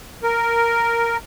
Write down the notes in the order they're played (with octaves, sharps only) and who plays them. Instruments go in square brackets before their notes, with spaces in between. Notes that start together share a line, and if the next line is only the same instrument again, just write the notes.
[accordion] A#4